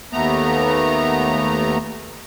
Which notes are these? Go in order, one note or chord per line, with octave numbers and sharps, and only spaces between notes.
D#2 A3 B3 A#5